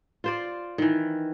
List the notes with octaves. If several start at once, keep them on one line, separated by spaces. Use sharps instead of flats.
F4 C5 D5
D#3 E3